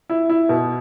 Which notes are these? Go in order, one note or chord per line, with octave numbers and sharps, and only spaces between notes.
E4
E4
B2